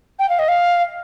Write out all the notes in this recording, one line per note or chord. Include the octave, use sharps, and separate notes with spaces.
G5
F5
D#5
F5